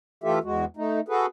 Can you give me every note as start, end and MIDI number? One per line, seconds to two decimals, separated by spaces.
0.24 0.39 52
0.24 0.39 57
0.24 0.39 65
0.24 0.39 67
0.24 0.39 69
0.24 0.39 76
0.44 0.65 40
0.44 0.65 56
0.44 0.65 66
0.77 1.00 57
0.77 1.00 63
1.08 1.26 66
1.08 1.26 68
1.08 1.26 69
1.08 1.26 71